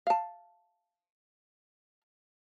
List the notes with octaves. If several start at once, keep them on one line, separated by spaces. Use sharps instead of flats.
F5 A5